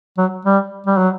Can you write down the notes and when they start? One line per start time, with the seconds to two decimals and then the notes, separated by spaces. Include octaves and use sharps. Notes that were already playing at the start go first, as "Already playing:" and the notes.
0.18 F#3
0.45 G3
0.87 G3
0.98 F#3